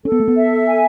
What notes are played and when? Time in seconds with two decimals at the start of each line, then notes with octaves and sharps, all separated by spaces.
0.05 C#4 A4
0.12 B3
0.20 A3
0.28 B3
0.36 E5
0.67 G#5